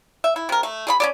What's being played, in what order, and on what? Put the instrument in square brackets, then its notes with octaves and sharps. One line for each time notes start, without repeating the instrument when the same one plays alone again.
[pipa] E5
E4
C3 A#4
A3
G#4 D5 B5
C#4 A4 D5